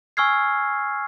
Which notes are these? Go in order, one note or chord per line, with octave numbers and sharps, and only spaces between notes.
G#5 C#6 E6 F6 G#6 C7